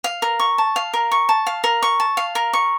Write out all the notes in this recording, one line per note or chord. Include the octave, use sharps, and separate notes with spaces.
F5
A#4
C#6
A5
F5
A#4
C#6
A5
F5
A#4
C#6
A5
F5
A#4
C#6